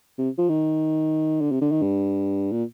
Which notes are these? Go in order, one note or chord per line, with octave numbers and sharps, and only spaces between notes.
C3
F3
D#3
D3
C3
D3
D#3
G2
A#2